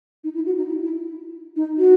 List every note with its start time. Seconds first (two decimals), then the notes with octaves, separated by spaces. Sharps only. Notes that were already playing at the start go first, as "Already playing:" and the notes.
0.24 D#4
0.35 E4
0.46 F#4
0.57 D#4
0.68 E4
0.83 E4
1.56 D#4
1.78 F#4